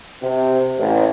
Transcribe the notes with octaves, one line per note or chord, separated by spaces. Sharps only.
C3
A1